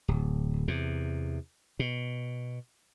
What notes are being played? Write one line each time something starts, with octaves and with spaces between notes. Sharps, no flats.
D1
E2 C3
B2